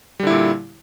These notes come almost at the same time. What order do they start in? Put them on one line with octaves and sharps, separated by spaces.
G3 D3 E4 A#2